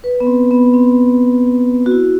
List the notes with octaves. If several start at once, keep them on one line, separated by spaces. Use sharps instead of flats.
B4
B3
C4
B3
C4
F#4
E4